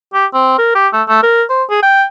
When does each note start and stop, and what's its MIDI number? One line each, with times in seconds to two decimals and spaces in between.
0.14 0.26 67
0.34 0.58 60
0.58 0.74 70
0.75 0.88 67
0.93 1.03 57
1.08 1.23 57
1.23 1.43 70
1.50 1.64 72
1.70 1.79 68
1.83 2.05 79